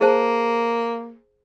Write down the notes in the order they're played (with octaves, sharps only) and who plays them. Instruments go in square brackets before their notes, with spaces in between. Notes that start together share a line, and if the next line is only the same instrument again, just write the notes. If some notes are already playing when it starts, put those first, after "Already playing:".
[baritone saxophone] A#3 [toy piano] G#4 C5 A5